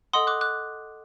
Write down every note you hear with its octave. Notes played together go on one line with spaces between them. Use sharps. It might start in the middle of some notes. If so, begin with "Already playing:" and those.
A4 D#5 F#5 C6 D#6
D6 F#6
D6 F#6